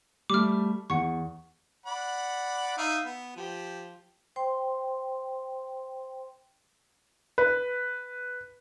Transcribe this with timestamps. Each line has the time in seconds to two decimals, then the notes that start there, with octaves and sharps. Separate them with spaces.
0.30 G3 A3 D6 F6
0.90 E2 F#5 C#6
1.86 D5 F#5 B5
2.77 D#4 E5 F5
3.04 B3
3.36 F3 G4
4.36 C5 G5 C6
7.38 B4